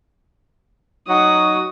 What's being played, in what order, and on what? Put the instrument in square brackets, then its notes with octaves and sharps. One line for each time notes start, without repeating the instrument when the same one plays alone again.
[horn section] F#3 D#4 F#4 [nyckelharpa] D#6